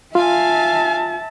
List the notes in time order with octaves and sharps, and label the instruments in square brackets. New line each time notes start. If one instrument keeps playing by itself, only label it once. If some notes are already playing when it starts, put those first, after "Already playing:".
[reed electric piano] F4 [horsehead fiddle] E5 A5 [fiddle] F5 G#5